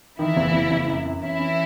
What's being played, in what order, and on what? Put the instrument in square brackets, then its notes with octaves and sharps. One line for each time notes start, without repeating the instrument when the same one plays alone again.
[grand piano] D#3 [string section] E3 E4
[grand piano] F#1
F#1
F#1
F#2
F#2
[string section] E3 E4 [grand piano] C#4
[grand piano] C#4